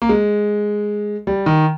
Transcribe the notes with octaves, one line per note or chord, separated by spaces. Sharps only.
A#3
G#3
G3
D#3